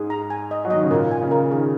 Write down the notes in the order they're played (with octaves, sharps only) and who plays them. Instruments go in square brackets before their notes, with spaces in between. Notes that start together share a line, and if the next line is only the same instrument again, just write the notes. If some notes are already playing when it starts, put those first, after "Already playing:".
Already playing: [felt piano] G#2 [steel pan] G#4
[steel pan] A#5
G#5
D#5
[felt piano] F#3
[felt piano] D#3 [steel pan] D#5
[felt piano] C#3
[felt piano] A#2 [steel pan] A#4
[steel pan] G#5
[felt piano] C#3
[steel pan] A#4
[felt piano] D#3 [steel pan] G#4